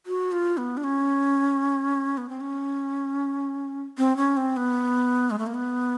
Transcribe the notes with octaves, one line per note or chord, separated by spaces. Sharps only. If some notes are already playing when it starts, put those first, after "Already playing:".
F#4
F4
B3
D4
C#4
B3
C4
C#4
C4
C#4
C4
B3
G#3
A3
A#3
B3